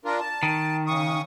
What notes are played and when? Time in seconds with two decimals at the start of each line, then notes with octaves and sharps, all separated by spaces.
0.05 D4 F4 A#4
0.20 A5
0.43 D#3
0.87 C#3 C#6 D#6